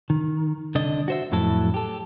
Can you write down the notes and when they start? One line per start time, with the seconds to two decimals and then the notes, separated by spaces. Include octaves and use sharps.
0.10 D#3
0.75 C2 D3 D4 D#5
1.08 F#4 C5 E5
1.32 F2 A2 F#3 E4 A4
1.74 G4 A4